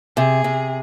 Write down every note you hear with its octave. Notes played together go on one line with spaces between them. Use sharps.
C3 G#4
C3